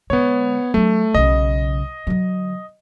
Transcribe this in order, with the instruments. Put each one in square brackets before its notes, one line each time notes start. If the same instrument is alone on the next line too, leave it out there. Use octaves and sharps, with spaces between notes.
[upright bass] D3 G#3 [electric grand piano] B3 C#5
[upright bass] F#3 D4 [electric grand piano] A3
[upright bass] B1 C#3 [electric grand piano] D#5
[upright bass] D3 F#3